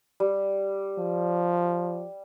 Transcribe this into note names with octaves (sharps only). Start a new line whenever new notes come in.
G3
F3